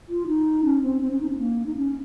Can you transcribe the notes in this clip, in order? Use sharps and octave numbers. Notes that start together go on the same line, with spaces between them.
F4
D#4
C#4
C4
C4
C#4
D#4
C#4
A#3
D#4
C#4